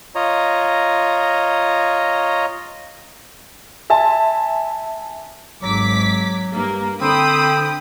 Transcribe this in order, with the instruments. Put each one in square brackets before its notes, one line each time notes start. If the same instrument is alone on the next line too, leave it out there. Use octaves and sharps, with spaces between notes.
[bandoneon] F4 C#5 D#5 A#5
[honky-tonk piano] E5 G#5 A5 C6
[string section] G#1 D6 B6 [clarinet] F#3
[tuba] G2 [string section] A#3
[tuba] D3 [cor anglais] C4 [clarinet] G5 [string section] B5 D#6